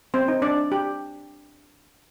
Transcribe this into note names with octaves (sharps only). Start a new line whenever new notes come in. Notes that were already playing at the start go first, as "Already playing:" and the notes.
C4 C5
D#4
D4 D5
G4